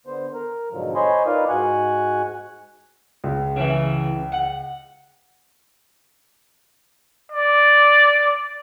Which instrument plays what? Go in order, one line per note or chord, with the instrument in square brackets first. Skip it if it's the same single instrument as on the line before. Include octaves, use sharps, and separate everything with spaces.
[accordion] D3 B3 C5
A#4
G#2 B2 D3 F3 F#3
C5 C#5 D#5 G#5 B5 C6
D#4 F4 A#4 B4 D5 F5
G#2 F#4 F#5 G#5 F#6
[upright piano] C#2
[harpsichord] C#3 E3
F#5
[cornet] D5